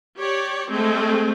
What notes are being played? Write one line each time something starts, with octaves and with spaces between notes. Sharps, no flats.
G4 C#5 D5
G#3 A3 C4